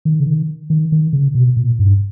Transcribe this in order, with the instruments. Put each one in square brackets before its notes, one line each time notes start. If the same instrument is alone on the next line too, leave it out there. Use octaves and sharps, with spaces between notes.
[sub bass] D#3
C#3
D#3
D#3
D#3
C#3
B2
A#2
G2